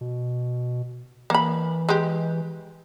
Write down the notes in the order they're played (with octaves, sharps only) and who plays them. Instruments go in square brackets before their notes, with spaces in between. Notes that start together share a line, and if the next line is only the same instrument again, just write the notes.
[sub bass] B2
[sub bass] E3 [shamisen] A#3 B5
[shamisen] G#3 G4